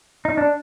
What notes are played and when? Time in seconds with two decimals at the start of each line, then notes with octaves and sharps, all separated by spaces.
0.25 D#4
0.37 D4